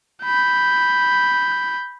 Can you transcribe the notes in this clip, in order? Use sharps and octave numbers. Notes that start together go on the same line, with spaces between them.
B5 G6